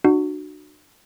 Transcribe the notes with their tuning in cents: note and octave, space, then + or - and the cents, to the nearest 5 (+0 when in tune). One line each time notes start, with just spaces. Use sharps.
D4 +35 F#4 +0